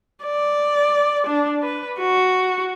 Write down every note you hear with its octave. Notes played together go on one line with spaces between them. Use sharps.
D5
D4
B4
F#4